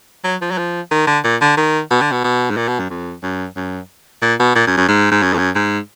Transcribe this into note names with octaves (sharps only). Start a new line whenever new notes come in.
F#3
F3
F#3
F3
D#3
D3
A#2
D3
D#3
B2
D3
B2
B2
G#2
A#2
B2
F#2
F2
F#2
F#2
A#2
B2
A#2
F#2
F#2
G#2
G#2
F#2
F2
F#2
G#2